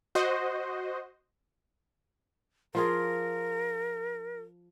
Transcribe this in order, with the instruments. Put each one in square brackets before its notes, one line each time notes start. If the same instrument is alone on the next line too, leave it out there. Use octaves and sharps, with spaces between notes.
[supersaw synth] F#4 C5 D#5
[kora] F3 F4 G#4 [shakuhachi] A#4